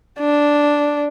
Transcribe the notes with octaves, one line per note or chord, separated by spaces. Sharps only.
D4